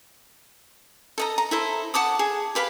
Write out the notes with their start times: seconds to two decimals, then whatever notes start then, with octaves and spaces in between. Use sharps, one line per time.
1.18 A4 D#5 A#5
1.38 A#5
1.51 E4 A4 C5
1.94 F#5 A5 D6 D#6
2.19 G#4
2.55 G4 B4 F5 B5